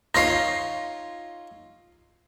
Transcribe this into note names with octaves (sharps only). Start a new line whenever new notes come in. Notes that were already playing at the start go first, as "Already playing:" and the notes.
D#4 F4 C#5 A#6 C7